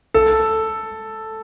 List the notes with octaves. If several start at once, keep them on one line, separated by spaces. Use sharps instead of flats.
A4